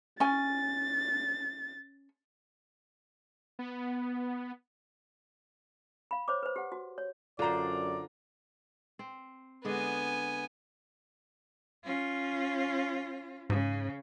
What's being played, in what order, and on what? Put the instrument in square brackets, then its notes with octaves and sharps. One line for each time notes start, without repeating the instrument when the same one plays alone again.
[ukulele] C#4 G#5 [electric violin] A6
[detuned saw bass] B3
[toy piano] F5 B5
C5 C#5 D6
B4 C5
G4 F#5
F#4
C#5
[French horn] F#2 [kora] D3 C5 [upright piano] F4 A#5 [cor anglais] D5
[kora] C4
[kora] D3 G#3 D#5 [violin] B3 G#5
[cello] C#4 F4
[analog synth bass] G#2 [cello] C#3